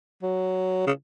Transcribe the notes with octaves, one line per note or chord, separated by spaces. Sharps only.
F#3
C#3